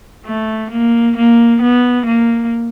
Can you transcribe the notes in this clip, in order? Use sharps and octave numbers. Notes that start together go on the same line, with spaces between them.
A3
A#3
A#3
B3
A#3